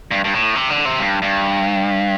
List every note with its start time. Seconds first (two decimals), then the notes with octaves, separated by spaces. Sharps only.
0.11 G2
0.24 G2
0.34 A2
0.55 C3
0.70 D3
0.85 C3
1.00 G2
1.22 G2